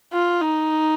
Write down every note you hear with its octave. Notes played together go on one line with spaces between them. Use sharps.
F4
D#4